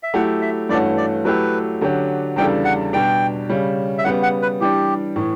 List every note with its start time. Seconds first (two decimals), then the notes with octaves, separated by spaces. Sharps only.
0.03 E5
0.14 F#3 A3 E4 G4 F#5
0.42 E5
0.69 G2 E3 A3 C#4 F#4 D5
0.97 D5
1.25 F#3 A3 E4 G4 B4
1.81 D3 F#3 C#4 G4
2.36 E2 C#3 G3 D4 A4 G5
2.65 F#5
2.93 B2 G3 D4 G4 G5
3.49 C#3 G3 C#4
3.98 E5
4.04 C#3 G3 B3 F#5
4.23 F#5
4.42 B4
4.60 E3 G3 D4 G4
5.16 A2 E3